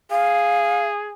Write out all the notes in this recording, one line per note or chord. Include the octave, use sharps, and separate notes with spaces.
G#4 F5